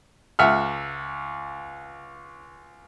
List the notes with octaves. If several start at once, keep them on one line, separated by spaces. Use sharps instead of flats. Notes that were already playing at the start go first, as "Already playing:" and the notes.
C#2 E5 F#5 F6